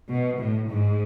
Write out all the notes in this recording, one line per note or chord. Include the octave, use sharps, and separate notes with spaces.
B2
A2
G#2